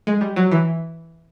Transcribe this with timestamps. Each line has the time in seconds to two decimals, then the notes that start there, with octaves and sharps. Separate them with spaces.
0.07 G#3
0.21 G3
0.36 F#3
0.52 E3